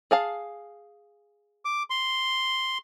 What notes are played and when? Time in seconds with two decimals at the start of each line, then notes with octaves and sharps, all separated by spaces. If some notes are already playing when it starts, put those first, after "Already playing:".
0.11 G#4 F5 A5
1.65 D6
1.90 C6